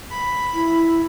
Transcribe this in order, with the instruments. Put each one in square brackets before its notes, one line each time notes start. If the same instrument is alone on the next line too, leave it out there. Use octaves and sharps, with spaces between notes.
[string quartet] B5
[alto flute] E4